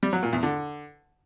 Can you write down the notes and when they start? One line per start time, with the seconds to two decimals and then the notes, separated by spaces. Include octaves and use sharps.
0.03 G3
0.13 F#3
0.23 A#2
0.33 E2
0.43 D3